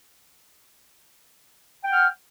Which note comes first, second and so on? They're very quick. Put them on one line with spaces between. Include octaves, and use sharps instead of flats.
G5 F#5 F6